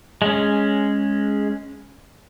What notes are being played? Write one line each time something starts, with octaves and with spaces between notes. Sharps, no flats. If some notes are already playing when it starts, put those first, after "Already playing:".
G#3 C#4